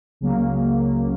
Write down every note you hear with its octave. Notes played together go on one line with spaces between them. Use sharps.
C#2 C#3 F#3 A#3